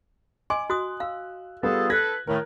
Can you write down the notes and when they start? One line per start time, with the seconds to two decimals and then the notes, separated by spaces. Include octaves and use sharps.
0.50 D#5 G#5 C6 D6
0.70 F#4 D#6 F#6
1.00 F5 E6
1.63 G3 B3 F4 G#4 A4
1.90 A4 B4 F#6 G#6 A#6
2.27 A2 D#3 A3 A#4